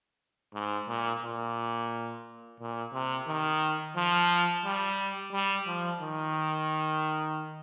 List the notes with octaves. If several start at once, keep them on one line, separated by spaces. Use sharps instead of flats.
G#2
A#2
A#2
A#2
C3
D#3
F3
G3
G3
F3
D#3